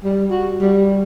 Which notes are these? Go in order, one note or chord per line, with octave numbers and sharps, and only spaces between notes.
G3
F#4
G3